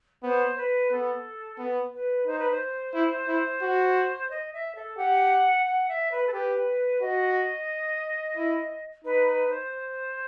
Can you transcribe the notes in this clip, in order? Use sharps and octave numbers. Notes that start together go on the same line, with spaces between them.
B3 C5
B4
B3 A4
B3
B4
D#4 C5
B4
C5
E4
E4
F#4
D#5
E5
A4
G4 F#5
F#5
E5
B4
A4
G4 B4
F#4 D#5
E4
D#4 B4
B4
C5